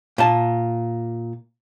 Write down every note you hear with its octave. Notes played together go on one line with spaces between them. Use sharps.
A#2 A5